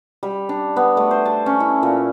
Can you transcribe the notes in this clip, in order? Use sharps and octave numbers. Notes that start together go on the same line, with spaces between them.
G3
D4
B3
A3
C5
A5
C#4
E4
A#2